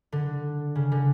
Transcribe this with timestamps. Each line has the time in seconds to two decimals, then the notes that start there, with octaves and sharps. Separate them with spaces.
0.12 D3
0.75 C#3
0.92 D3